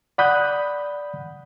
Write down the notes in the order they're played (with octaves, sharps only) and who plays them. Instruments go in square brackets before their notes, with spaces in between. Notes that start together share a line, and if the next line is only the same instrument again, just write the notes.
[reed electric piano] D5 F#5 B5 D#6 F#6 G6